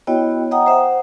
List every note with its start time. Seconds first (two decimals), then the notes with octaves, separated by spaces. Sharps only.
0.07 B3 E4 F#4 C#5 D#5 G5
0.51 D#5 F#5 G5 A#5 D#6
0.66 C5 E5 F#5 G5